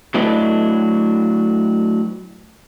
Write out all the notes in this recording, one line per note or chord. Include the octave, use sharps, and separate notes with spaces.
F#3 A3 D4 E4 B4 D#5